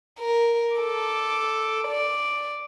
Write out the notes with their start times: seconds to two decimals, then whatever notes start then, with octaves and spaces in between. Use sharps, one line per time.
0.20 A#4
0.76 A4 D6
1.88 D5